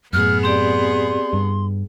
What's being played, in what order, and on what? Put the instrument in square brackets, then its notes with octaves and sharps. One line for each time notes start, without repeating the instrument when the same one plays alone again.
[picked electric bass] F#2 A2 [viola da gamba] B3 G#4 [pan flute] F6
[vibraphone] C4 G4 D5 [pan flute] C6
[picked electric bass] G2